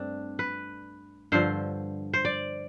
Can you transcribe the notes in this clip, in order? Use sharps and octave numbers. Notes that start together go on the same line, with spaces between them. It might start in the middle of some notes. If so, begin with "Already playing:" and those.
Already playing: G2 A3 C4 D4
B4
G2 D3 F3 C5
C5
D5